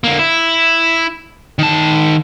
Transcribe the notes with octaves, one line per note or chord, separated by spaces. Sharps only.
D3 A#3
E4
D#3 A5